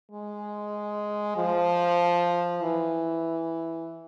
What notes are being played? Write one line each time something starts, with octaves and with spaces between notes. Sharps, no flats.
G#3
F3
E3